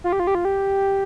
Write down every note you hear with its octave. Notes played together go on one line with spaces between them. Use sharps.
F4
G4
F4
G4
F4
G4